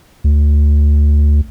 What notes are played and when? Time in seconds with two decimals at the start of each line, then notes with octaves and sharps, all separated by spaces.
0.24 D2